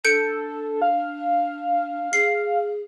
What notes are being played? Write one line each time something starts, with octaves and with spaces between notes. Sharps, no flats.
D4 A4 G6 C#7 D7
F5
G#4 C7